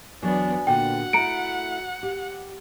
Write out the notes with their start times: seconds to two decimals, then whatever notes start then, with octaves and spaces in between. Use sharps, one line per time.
0.22 E2 F#3 B3 D4 F#4 G#5
0.67 A#2 D3 B3 F#4 F#5 G5
1.13 A3 E4 A#5 C#7 D7
2.03 G4